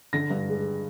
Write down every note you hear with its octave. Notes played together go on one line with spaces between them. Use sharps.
D3 A#6
G2
G#3